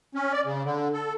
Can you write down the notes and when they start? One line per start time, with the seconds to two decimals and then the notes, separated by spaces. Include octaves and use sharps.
0.15 C#4
0.33 D5
0.45 C#3
0.64 D3
0.93 A4